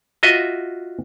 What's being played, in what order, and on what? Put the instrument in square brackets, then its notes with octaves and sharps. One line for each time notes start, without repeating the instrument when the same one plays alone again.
[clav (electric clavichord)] F4 F#4 D#5 E5